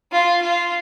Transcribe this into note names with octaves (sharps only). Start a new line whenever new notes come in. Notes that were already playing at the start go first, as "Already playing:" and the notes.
F4
F4